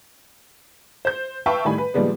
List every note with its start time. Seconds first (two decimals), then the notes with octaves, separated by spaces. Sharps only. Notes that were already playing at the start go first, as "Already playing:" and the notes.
1.05 C5 G6
1.46 B4 E5 F5 G5 A5 C#6
1.65 A2 D#3 G3 G#5 B5
1.78 B4
1.94 A#2 D#3 F3 G3 G#3 B3